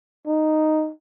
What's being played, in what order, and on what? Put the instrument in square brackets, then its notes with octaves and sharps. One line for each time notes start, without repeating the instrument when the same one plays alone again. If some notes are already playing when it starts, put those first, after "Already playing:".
[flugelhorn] D#4